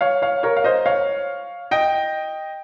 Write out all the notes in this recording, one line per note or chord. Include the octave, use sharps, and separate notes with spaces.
C#5 F5
C#5 F5
A#4 C#5
F5
C5 D#5
C#5 F5
D#5 G5